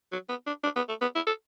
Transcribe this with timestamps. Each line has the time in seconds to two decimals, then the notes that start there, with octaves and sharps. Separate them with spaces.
0.12 F#3
0.29 B3
0.47 D4
0.63 D4
0.76 B3
0.89 A3
1.01 B3
1.15 E4
1.27 A4